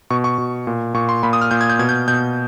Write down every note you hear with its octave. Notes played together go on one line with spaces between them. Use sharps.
B2 C#6
C#6
B2
A#2
A#2 C#6
C6
A#2 B5
D#6
F6
A#2 G6
G#6
G6
B2 G#6
G6
B2 G6